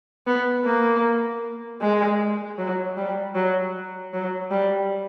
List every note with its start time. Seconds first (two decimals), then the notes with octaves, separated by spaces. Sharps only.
0.27 B3
0.65 A#3
1.81 G#3
2.58 F#3
2.97 G3
3.35 F#3
4.13 F#3
4.51 G3